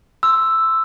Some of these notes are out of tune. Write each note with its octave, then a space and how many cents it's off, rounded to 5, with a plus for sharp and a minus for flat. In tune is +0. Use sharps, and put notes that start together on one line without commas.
C6 +0 E6 +0